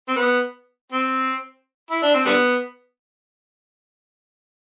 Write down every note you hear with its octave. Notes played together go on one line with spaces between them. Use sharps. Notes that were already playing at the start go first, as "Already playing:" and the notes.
C4
B3
C4
E4
D4
C4
D3 G3 B3